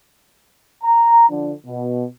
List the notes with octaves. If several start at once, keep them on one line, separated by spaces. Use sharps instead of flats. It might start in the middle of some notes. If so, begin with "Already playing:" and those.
A#5
D3 F3
B2